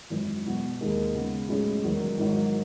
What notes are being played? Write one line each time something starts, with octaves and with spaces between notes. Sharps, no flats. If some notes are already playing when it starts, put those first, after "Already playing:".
G#1 F#2 E3
E1 E2 B2
D#2 D#3 G#3
C#3 G#3 B3
B1 A2 G#3 C#4
E1 E2 D#3 F#3
G#1 G#2 D#3 F#3